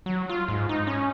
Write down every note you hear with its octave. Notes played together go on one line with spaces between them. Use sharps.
F#3
F4
G#2
D#4
C#4